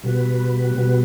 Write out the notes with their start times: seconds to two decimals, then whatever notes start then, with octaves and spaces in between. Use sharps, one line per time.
0.03 B2 G3 B3 F#4 B4
0.76 B2 G3 B3 F#4 B4